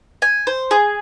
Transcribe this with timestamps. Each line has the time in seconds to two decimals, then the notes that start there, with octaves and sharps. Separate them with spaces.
0.22 G#5
0.47 C5
0.71 G#4